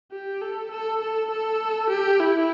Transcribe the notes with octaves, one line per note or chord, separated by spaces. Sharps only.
G4
A4
A4
A4
A4
G4
E4